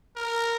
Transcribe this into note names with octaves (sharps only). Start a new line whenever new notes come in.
A#4